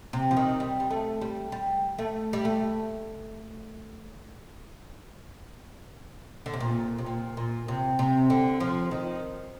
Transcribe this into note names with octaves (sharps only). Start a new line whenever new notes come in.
C3
F3
D#3
G3
G3
A3
G3
G3
A3
G3
A3
D3
C3
A#2
C3
A#2
A#2
C3
C3
D3
F3
D#3